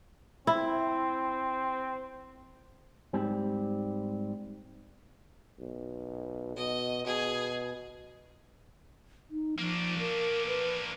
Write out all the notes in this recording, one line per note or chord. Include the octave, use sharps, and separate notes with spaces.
C4 E4
G#2 G3 C4
B1
B2 D#5
B2 G#4
D#4
F3 A#3 D4
A#4
B4